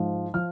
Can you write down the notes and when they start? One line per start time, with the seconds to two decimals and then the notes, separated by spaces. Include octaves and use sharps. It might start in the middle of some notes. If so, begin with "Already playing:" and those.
Already playing: G#2 F3
0.34 F3 F6